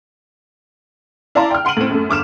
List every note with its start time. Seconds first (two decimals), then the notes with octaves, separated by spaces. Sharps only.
1.35 E4 D5 F5 A5 A#5 C6
1.51 G5 F6
1.65 F#5 C6 D7 D#7 F#7
1.77 A2 C4
1.91 F#2 A3
2.09 G1 D6 F6 E7